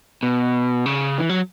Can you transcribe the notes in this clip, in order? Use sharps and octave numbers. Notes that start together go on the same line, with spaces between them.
B2
C#3
E3
F#3